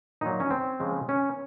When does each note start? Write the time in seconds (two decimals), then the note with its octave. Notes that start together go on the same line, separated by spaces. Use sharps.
0.21 A#2 F#3 D#4
0.40 C#4
0.51 C4
0.80 C#3 F3 G#3
1.09 C#4